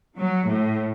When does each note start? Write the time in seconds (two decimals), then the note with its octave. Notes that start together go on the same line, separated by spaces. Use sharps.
0.17 F#3
0.49 A2